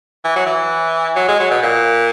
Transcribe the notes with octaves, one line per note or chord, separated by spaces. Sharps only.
E3
F#3
E3
F#3
G#3
F#3
B2
A#2